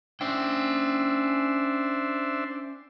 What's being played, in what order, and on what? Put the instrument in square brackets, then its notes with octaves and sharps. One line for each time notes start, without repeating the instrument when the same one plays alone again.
[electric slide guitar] C#4 G5 [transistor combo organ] D4 C5 E5